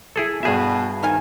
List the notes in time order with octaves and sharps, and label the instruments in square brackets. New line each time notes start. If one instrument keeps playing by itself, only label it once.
[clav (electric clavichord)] E4 G#4 A4
[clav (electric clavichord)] G2 G#4 E5 [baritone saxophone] B2
[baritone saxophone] D#3 [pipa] F3 F5 G#5